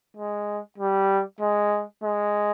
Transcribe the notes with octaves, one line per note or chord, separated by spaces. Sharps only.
G#3
G3
G#3
G#3